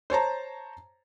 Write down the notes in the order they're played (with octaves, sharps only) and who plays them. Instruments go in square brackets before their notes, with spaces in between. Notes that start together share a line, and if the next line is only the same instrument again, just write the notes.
[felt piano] C5 C#5 A5 A#5